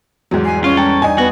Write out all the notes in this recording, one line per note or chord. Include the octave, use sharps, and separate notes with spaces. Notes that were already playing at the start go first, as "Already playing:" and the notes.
E2 G#2 F#3 G3
G#5 C7
C#4 F4
A4 G5 A#5 C#6
D4 D#4 E5 G#5
B3 F#4